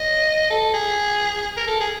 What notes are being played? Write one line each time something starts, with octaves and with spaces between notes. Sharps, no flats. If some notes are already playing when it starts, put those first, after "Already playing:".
Already playing: D#5
A4
G#4
A#4
A4
G#4